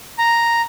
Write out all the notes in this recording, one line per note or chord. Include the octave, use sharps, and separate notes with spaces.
A#5